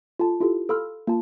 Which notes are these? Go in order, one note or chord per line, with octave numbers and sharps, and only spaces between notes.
F4 A4 A5
E4 F4 G4 A4
A4 F5 B5 C6 E6 F6
A#3 F4 A5